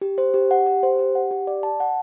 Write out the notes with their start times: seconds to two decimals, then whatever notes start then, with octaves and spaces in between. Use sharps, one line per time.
0.02 G4
0.18 C5
0.34 G4
0.51 F#5
0.66 G4
0.83 C5
0.99 G4
1.15 F#5
1.31 G4
1.47 D5
1.63 A5
1.80 F#5